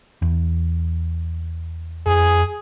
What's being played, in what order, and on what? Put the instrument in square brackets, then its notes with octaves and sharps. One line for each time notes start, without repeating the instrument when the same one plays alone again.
[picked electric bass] E2
[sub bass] F2 [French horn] G#4